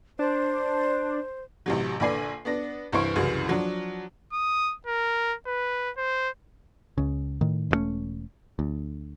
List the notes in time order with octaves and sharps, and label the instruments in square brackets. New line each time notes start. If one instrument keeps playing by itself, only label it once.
[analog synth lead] D4 [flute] C5
[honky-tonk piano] A1 C3 F#3
A#1 D3 B4 D5 G#5 C7
B3 D4 A#6
C2 G2 E3 C5 C#6 D7
C2 F#2 C#3 E3
F3 F#3 D4
[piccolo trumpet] D#6
A#4
B4
C5
[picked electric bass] C#2 C#3
A2 D#3
E1 G2 A3 C#4
D2